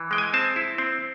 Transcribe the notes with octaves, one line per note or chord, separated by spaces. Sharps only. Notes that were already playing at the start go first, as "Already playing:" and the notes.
Already playing: E3
G#3 G5
G#5
C4 A5
E4
C4